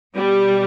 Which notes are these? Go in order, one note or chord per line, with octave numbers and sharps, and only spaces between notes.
B2 G3